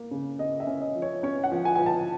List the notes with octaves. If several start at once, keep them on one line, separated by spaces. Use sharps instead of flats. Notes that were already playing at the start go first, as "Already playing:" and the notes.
Already playing: A#3
C#3
C#3 D#5
E5
C#4
D#5
F3
C#5
C#4 C#5
F#5
F3
G#5
F3 G#5
A5